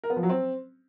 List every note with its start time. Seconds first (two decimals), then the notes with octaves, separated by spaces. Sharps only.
0.04 A#4
0.10 B3
0.16 F3
0.23 F#3
0.29 C4